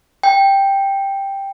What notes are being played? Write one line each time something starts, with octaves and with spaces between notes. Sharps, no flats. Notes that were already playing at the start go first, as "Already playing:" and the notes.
G5